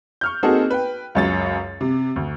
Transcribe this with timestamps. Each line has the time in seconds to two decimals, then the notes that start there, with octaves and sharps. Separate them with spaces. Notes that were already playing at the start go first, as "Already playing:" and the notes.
0.21 C#6 F6 G6
0.43 A#3 C4 D#4 F#4 G#4 A4
0.70 B4 G5
1.15 C#2 F#2 A6
1.81 C3
2.16 D2